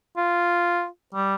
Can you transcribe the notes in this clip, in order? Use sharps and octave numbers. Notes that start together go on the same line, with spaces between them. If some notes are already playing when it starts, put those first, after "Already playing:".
F4
G3